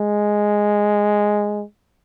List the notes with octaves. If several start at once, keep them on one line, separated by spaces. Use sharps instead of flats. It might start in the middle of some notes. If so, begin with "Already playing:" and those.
Already playing: G#3